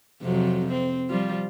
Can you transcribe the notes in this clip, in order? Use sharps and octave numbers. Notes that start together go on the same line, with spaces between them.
F2 C3 F#3
C4
F3 G3 F4